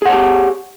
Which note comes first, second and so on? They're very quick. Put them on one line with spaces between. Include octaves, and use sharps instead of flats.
G#4 F#5 C#5 G4